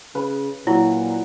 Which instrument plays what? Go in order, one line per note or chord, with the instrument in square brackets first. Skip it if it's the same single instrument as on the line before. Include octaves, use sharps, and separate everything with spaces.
[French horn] C#3 [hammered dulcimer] B4
[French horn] A#2 [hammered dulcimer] F#3 [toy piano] E4